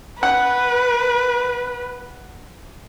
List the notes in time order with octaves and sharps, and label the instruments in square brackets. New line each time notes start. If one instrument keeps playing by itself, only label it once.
[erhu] B4 [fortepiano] F#5